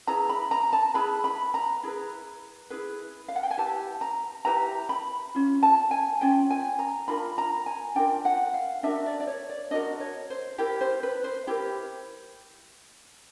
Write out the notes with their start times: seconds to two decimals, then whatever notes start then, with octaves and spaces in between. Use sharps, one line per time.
0.07 E4 G#4 B4 A#5
0.29 B5
0.51 A#5
0.73 A5
0.94 E4 G#4 B4 B5
1.24 B5
1.54 A#5
1.83 E4 G#4 B4
2.70 E4 G#4 B4
3.28 F5
3.36 F#5
3.43 G5
3.51 G#5
3.58 E4 G4 B4 A5
4.01 A#5
4.45 E4 G4 B4 A#5
4.89 B5
5.35 C#4 F4
5.63 A5
5.91 G#5
6.21 C#4 F4 G5
6.50 G#5
6.79 A#5
7.08 D4 F4 A#4 B5
7.38 A#5
7.66 G#5
7.95 D4 F4 A#4 G5
8.25 F#5
8.54 F5
8.83 D4 F#4 A#4 E5
9.06 D5
9.20 D5
9.27 C#5
9.50 D5
9.71 D4 F#4 A#4 D#5
10.00 C#5
10.30 C5
10.58 E4 G4 A#4
10.81 C5
11.03 B4
11.24 C5
11.47 E4 G4 A#4